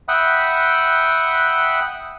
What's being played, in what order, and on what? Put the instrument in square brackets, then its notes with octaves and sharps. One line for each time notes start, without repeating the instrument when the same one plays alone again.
[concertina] E5 F#5 G5 B5 D#6 F#6